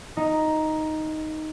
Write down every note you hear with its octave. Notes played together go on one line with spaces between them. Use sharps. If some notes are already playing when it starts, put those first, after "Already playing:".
D#4